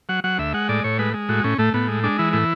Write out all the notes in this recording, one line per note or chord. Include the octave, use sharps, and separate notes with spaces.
F#3 F#5
F#3 F#5
D2 E5
G#3 F#5
A2 D5
A2 C#5
G#3 B4
G#3
A2 F#4
A2 C#4
A2 A3
A2 B3
G#3
G#3 D4
E3 E4
A2 E4